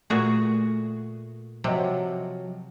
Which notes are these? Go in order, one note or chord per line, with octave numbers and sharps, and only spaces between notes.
A#2 A3 F#4 G#4
C3 F3 F#3 D#5